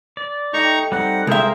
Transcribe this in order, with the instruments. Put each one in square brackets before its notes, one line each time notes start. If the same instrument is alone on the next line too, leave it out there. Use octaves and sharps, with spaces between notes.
[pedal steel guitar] D5
[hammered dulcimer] A3 G4 [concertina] D#4 A#5 C#6
[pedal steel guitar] G3 C4 D#4 [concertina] F#5
[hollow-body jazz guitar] C2 E5 [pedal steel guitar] G#3 A#4 [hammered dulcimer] C4 F4 [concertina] G#4 C5